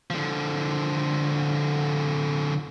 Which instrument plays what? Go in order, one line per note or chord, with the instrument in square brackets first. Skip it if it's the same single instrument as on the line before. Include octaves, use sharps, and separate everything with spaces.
[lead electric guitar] D3 F3